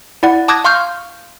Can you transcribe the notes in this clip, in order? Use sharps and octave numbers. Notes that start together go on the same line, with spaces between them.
E4 D5 F#5
A5 D6 D#6 F#6 G#6 A#6
F5 C6 C#6 F6 G6